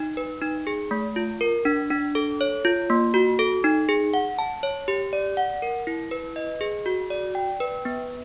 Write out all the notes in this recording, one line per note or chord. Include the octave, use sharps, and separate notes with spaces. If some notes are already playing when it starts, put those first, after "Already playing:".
Already playing: D#4
B4
D#4
G#4
A3
F4
A#4
D4
D4
A4
C#5
F4
A#3
F#4
A4
D#4
G#4
F#5
A5
C#5
G4
D5
F#5
A#4
E4
B4
D#5
G#4
F#4
D5
G5
B4
B3